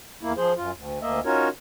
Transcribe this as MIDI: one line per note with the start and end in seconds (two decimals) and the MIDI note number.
0.23 0.33 40
0.23 0.33 58
0.23 0.33 64
0.38 0.53 53
0.38 0.53 68
0.38 0.53 72
0.57 0.71 42
0.57 0.71 65
0.76 0.99 38
1.01 1.20 38
1.01 1.20 58
1.01 1.20 75
1.01 1.20 76
1.25 1.48 61
1.25 1.48 63
1.25 1.48 65
1.25 1.48 66
1.25 1.48 70
1.25 1.48 73